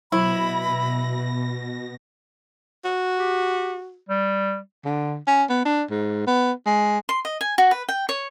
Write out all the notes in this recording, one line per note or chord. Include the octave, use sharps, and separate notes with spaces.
B2 F#3 E4 B5 A#6
F#4
G4
G3
D3
C#4
B3
D4
G#2
B3
G#3
C6
D#5
G#5
F#4
B4
G5
C#5